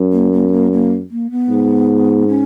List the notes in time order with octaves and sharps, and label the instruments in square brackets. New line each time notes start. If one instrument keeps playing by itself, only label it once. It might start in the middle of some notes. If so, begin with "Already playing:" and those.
Already playing: [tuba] F#2
[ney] A#3
A#3
B3
A#3
A#3
A#3
B3
[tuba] G#2
[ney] C#4